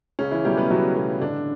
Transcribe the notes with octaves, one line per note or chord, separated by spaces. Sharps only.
C#2 C#3 C#4
E3 E4
B2 F#3 G3 A3 G4
B3 B4
C#2 F#3 F#4
B2 F#3 A3
A1 D3 D4